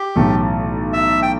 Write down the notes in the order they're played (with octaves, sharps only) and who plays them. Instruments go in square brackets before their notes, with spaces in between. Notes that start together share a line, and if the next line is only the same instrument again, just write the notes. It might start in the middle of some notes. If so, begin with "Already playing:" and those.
Already playing: [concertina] G4
[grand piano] B1 A2 E3 A3 E4
[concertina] E5
G5